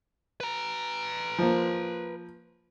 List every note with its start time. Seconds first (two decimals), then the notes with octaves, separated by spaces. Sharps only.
0.40 B4 A#5
1.38 F3 A#3